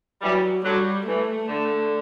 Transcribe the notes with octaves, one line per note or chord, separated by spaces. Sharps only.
E3 F#3 G3
D3 F#3 G3
E3 A3
D3